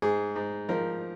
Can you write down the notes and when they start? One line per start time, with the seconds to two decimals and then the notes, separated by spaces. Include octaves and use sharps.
0.02 G#2 G#4
0.36 G#2
0.69 F3 A#4